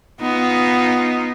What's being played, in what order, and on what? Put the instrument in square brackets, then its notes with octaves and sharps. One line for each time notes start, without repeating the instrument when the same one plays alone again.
[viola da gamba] B3 D#4 F4